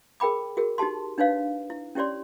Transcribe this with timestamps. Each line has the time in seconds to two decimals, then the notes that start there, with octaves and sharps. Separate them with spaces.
0.20 G#4 A#4 G5 B5 D6
0.57 F#4 G#4 A#4
0.78 D#4 F#4 G4 A5 C6
1.18 D4 D#4 B4 C#5 F5
1.70 E4
1.95 C#4 E4 G4 C#5 D5 C6